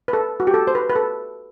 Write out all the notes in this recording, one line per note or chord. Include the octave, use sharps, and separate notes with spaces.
B4
A4
F#4
G4
A4
C5
B4
B4
A4